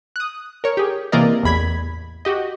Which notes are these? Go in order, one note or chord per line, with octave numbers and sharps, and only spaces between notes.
D#6 F#6
A#4 C#5
G4 G#4
C3 E3 A#3 A#4 D5 D#5
A1 E2 B5 G#6 B6
F#4 G4 D#5